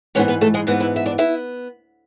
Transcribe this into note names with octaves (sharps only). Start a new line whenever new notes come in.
G#2 E3 B3 C#4 C#5
B3 B4
A3 A4
G#3 G#4
G#2 E3 B3 F#4
E4
E5
D4 D5
B3 E4 E5